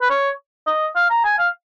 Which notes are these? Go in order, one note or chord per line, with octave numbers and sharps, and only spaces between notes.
B4
C#5
D#5
F5
A#5
G#5
F5